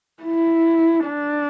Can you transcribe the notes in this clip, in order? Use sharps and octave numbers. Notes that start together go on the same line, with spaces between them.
E4
D4